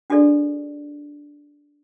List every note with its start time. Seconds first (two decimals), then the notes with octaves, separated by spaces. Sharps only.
0.10 D4 F#4 G#4 A4 D5 D#5